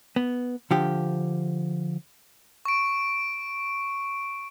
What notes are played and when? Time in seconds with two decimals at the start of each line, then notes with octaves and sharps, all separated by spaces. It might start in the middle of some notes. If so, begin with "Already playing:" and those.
0.16 B3
0.71 D3 F3 G4
2.65 C#6 D7